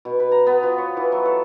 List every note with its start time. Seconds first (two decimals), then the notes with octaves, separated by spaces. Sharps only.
0.05 B2
0.20 B4
0.32 A#5
0.47 B3
0.63 F3
0.78 C#5
0.97 E3
1.12 F#3
1.25 A4